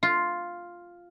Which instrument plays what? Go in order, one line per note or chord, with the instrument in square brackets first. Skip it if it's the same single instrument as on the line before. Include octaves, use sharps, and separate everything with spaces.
[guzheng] F4